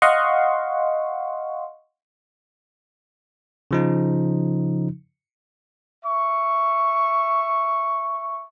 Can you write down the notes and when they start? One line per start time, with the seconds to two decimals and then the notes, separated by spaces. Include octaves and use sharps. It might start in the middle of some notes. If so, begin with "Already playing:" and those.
0.02 D#5 F5 F#5 C6 C#6
3.71 C#3 F3 D#4
6.05 E5 C#6